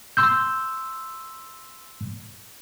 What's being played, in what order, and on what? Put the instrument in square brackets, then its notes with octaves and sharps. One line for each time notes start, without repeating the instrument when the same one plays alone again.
[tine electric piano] C6 E6 G6